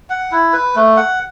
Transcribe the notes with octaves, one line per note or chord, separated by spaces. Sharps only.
F#5
E4
B4
A3
F#5